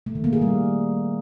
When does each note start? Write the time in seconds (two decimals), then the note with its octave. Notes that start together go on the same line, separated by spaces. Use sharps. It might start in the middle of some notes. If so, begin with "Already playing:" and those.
0.06 A3
0.15 D#3
0.24 A#3
0.33 G#4
0.42 G3